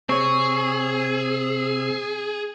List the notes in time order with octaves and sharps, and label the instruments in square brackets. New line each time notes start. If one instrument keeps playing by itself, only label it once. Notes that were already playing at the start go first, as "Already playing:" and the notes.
[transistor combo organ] C3 E6 [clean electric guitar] C4 C#5 [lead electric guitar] G#4 [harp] C#6